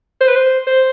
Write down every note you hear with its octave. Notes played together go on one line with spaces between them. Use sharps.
C5
B4
C5
C5